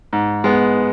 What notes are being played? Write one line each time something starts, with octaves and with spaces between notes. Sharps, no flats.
G#2
G#3 B3